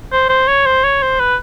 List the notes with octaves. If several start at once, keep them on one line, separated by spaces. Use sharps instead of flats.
C5
C5
C#5
C5
C#5
C5
B4